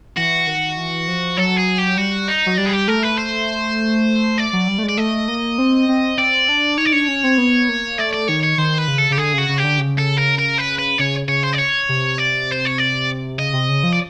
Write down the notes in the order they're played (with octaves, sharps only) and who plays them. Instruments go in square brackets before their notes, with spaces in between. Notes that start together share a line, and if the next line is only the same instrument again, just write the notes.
[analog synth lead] E3 [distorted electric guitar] F#4
[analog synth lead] D#3
E3
F3
[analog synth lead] F#3 [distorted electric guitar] A4
[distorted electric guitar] G#4
G4
[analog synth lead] G3 [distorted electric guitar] F#4
[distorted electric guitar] D#4
[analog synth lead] F#3
[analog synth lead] G3 [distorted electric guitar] D4
[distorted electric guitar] G#4
G4
[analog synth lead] A3 [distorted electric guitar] A#4
[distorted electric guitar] B4
C5
D5
[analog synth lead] F#3
G3
A3
G#3
[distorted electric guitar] D5
[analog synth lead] A3 [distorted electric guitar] D#5
[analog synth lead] A#3
C4
C4
[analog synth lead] C4 [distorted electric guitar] D5
[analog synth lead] D4
[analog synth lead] D#4 [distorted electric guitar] C#5
[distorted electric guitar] D5
[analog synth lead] D4 [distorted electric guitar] C#5
[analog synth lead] C#4
C4
B3
A#3
[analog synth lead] A3 [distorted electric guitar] D5
[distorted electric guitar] D5
[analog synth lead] D#3 [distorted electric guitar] C#5
[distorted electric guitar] C#5
[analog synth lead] D#3 [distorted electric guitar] C5
[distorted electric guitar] B4
[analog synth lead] C#3
[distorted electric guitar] A4
[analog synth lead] C#3 [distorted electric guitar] G4
[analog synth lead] D3 [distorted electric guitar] G#4
[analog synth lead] C#3 [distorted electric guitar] F#4
[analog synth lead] C#3
[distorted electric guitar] G4
[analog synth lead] D3
C#3
[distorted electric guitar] A4
A#4
A#4
B4
B4
[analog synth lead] C#3 [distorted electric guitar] C#5
[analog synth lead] C#3 [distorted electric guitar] C#5
[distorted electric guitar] C5
D5
C#5
[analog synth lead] C3
[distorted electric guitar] D5
C5
C#5
D5
[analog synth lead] C#3 [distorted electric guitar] D#5
[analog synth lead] C3
C#3
F3
[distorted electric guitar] D5